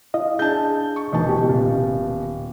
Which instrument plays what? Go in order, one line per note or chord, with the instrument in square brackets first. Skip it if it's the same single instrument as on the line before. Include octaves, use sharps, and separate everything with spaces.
[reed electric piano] E4 D#5 F5
[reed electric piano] D4 G#4 [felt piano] A5 G6
[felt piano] C#6
[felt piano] E1 E3 A5 [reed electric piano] A#3 D#5
[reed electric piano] B3 G4
[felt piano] D#1